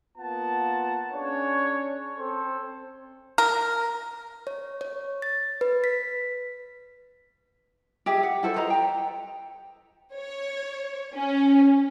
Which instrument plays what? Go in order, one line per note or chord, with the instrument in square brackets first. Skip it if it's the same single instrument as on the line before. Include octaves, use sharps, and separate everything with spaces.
[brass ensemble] A#3 B3 F4 F#5 A5
C#4 D4 G#4 C#5
C4 A4 C5
[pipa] A#4
[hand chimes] C#5
C#5
A6
B4
B6
[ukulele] G4 G#4 E5
F#5
E4 A4 C5
B4 C5 D#5 A#5
G5 A#5
[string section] C#5
C#4